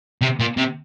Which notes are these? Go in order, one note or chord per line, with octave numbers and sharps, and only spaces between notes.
C3
A#2
C3